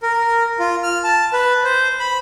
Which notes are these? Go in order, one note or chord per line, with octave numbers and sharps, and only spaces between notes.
A#4
F4
F6
A5
B4
C5
B5